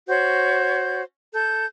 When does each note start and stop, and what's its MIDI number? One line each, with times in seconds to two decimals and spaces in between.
0.08 1.02 66
0.08 1.02 72
0.08 1.02 73
0.08 1.02 91
1.34 1.66 69
1.34 1.66 91